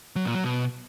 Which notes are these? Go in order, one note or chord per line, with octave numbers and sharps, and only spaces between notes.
F#3
A#2
F#3
B2